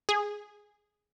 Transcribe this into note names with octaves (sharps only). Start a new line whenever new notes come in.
G#4